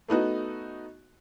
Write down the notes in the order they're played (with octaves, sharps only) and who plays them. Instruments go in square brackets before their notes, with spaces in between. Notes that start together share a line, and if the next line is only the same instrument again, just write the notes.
[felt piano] A3 B3 D#4 F#4